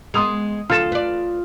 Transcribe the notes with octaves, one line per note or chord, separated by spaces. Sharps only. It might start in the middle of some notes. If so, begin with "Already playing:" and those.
G#3 B3 C6 D#6 F7
D2 F4 A4 F6 A6 E7
B4 D5